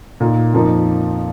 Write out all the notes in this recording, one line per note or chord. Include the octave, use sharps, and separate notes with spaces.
A#2 A#3 D#4
F2 F3 A#3 D#4